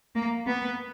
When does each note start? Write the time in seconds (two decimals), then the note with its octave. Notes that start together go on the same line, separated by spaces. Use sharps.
0.15 A#3
0.47 B3